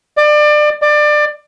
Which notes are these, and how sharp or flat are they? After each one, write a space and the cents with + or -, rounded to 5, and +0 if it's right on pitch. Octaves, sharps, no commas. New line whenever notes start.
D5 +30
D5 +25